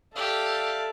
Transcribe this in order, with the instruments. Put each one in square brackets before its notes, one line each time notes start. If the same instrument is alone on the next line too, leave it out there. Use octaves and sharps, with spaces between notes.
[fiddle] G4 [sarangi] A4 [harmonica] D5 E5 F5